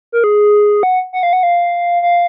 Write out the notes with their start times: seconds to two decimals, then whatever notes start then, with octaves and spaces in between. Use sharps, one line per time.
0.12 A#4
0.24 G#4
0.83 F#5
1.13 F#5
1.23 F5
1.33 F#5
1.43 F5
2.02 F5